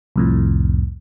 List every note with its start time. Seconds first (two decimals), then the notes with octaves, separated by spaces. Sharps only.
0.16 C2 F2 A2